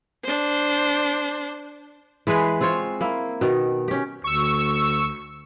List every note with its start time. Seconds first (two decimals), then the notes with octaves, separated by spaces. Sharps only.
0.24 D4 C5
2.27 E3 G#3 G#4 B4
2.61 C4 F4 C5 C#5
3.01 A#3 E4
3.41 B2 D#3
3.88 C#4 G4
4.24 D2 C#6 E6